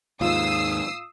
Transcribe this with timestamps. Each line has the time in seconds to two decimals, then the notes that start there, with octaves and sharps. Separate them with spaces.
0.21 D#2 G#2 F4 D#6 E6 C7